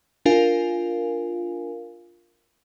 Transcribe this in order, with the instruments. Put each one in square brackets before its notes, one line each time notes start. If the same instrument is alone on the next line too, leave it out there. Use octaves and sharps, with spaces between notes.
[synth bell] D4 F4 A#4 F5 G#5